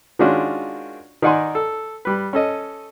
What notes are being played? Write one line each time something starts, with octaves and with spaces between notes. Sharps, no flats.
D#3 G#3 C#4 D4 F4 F#4
D#3 D#4 D5 F#5 G#5 C6
A4
G3 B4
C#4 A4 D#5